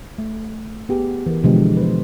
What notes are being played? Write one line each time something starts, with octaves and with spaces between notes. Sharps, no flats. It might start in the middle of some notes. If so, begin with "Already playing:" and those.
A3
B3 G4 G#4
E3 A#4
B2 D3 E3 F3 G#3 G4
B4 C5